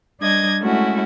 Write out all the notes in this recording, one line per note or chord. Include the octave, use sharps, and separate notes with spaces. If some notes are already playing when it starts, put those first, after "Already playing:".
G3 D4 D#5 G#6 A#6
G#3 A3 C#4 E4 F#4